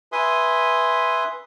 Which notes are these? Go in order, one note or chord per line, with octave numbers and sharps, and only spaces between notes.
B4 E5 G#5 C6 D#6